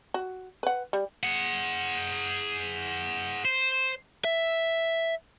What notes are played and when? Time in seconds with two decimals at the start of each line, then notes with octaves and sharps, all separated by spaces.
0.14 F#4
0.63 B4 F#5
0.93 G3
1.23 G#4 F#5
3.45 C5
4.25 E5